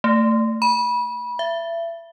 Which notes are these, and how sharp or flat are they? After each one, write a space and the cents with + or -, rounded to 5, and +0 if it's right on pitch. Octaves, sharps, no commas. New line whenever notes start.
A3 +25
B5 -25
E5 +30